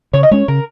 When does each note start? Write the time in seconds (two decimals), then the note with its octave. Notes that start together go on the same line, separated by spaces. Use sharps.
0.13 C#3 C#5
0.23 D#5
0.31 G#3 C#4 C#5
0.48 C#3 A#4